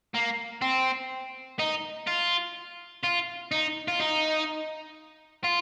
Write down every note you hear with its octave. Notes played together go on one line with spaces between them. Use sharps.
A#3
C4
D#4
F4
F4
D#4
F4
D#4
F4